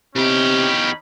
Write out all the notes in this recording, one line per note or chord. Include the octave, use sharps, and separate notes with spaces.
E2 C3 C#4 D#4 G4 B5